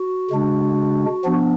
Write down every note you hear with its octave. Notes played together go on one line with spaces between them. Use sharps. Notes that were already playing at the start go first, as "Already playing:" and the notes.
Already playing: F#4
C#3 G#3 D4
F3 B3 D4